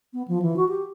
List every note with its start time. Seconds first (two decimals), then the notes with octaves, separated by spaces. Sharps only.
0.13 B3
0.28 F3
0.42 E3
0.57 F#4
0.69 G4